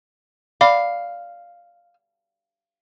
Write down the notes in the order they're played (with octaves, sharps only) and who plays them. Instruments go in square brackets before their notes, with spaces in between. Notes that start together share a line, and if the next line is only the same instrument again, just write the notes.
[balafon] D5 B5 D6 [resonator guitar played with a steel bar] F5